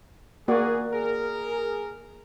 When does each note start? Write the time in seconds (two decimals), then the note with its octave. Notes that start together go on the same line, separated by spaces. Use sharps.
0.48 A#3 F#4 G#4 D5
0.93 G#4 A#4